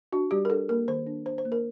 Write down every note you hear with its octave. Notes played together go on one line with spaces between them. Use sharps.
D4 F#4
G3 G4
A#4
D4 A4
A#3 A#4
D#3 C5
D4
D4 C5
C5
A#3
A#4